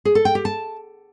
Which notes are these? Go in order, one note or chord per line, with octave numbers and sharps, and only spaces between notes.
G#4
A4
G5
G4
A5